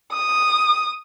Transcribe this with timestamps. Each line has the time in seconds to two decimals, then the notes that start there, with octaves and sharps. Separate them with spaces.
0.13 D#6